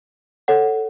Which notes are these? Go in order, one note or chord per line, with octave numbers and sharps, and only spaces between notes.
A4 C#5 F#5